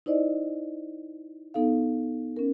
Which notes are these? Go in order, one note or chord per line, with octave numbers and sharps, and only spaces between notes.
D#4 E4 C5 D5 D#5
B3 D#4 A4 F5
C#4 A#4